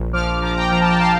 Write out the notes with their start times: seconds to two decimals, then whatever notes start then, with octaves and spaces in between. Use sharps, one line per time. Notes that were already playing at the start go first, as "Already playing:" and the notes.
Already playing: A#1
0.13 F3 D6 F6
0.41 F3 A#5 D6
0.56 G5 A#5
0.71 F3 A#5
0.80 A5
0.90 G5
1.00 F5 A5